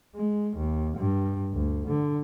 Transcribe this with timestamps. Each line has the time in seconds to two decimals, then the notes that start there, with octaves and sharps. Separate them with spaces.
0.15 G#3
0.57 D#2
0.97 G2
1.53 D2
1.88 D3